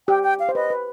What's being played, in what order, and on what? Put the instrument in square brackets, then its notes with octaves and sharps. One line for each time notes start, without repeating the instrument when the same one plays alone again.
[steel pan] G4 [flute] G5
[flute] G5
F5
[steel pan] C5
[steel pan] B4 [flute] D#5
[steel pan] B4